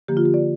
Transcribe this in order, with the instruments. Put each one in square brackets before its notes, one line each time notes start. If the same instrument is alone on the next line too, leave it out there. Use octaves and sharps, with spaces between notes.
[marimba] D3 F3 A#3 G4
F4
G4
D5